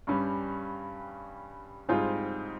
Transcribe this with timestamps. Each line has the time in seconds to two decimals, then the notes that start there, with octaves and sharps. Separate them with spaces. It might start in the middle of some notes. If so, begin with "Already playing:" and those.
0.07 G2 G3 C#4 G4
1.88 G#2 G3 C4 F4 G#4